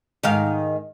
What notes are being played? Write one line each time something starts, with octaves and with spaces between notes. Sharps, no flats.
G#2 D#3 F5